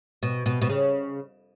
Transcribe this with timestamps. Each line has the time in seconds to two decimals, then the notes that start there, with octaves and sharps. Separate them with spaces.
0.23 B2
0.46 B2
0.62 B2
0.69 C#3